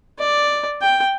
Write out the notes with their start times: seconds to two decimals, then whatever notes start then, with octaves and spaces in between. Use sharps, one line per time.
0.19 D5
0.82 G5